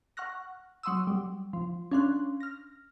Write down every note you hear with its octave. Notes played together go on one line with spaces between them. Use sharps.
F#5 C#6 F6 F#6 A#6
F#3 F#5 C6 D#6 E6
G3
F3
C#4 D4 F5 C6 F#6
F6 A#6